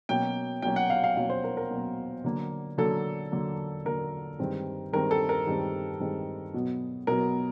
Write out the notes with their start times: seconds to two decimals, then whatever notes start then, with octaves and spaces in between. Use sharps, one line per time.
0.09 B2 F#3 A#3 C#4 G5
0.62 B2 F#3 A#3 C#4 G5
0.76 F#5
0.90 F5
1.04 F5
1.17 B2 F#3 A#3 C#4 F5
1.30 C5
1.44 A#4
1.57 A#4
1.71 B2 F#3 A#3 C#4
2.24 D3 F#3 A#3
2.78 D3 F#3 A#3 A4
3.32 D3 F#3 A#3
3.85 D3 F#3 A#3 A#4
4.39 G2 D#3 G#3 C4
4.93 G2 D#3 G#3 C4 A#4
5.11 A4
5.29 A#4
5.47 G2 D#3 G#3 C4
6.00 G2 D#3 G#3 C4
6.54 B2 F#3 B3
7.07 B2 F#3 B3 A#4